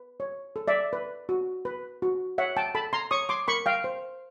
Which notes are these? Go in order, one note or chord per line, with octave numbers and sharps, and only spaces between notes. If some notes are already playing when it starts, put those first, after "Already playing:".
Already playing: B4
C#5
A4
D5 E5
B4
F#4
B4
F#4
C#5 E5 F#5
G5 A5
A4 A5 B5
A#5 C6
C#5 C#6 D#6
C6 D6
A#4 B5 C#6
F5 G5
C5